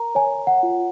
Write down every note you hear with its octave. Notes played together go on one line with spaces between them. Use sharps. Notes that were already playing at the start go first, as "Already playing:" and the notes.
Already playing: A#4 A#5
C#5 G#5
F#5
F4